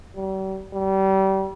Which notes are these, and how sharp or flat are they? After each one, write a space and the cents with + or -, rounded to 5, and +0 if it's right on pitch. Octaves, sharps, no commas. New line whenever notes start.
G3 -40
G3 -30